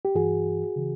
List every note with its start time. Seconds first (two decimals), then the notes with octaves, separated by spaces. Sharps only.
0.05 G4
0.15 G2 E3 F#4 G#4
0.76 C#3 E3